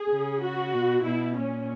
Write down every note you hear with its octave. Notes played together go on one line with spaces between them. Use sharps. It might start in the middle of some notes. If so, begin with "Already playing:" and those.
Already playing: G#4
C#3
F#4
B2
B2 E4
A#2 C#4